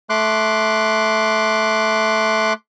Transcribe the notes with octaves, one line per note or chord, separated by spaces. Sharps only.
A3 C6 D6 F#6